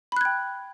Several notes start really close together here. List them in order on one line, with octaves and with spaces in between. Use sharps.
B5 F#6 G#6 G5